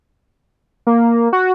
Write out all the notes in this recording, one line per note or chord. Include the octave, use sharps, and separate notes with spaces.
A#3
F#4